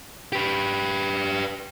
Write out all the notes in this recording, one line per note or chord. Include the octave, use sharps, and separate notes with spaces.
G4 B4